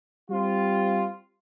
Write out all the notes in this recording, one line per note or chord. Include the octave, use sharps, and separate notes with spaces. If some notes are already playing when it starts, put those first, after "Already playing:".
G3 C4 F4